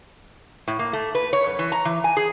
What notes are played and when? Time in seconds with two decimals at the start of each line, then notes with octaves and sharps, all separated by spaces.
0.68 A2
0.79 A#3
0.93 A3
1.15 B4
1.33 C#5
1.46 F#2
1.59 E3
1.72 A#5
1.85 E3
2.04 G#5
2.17 G#4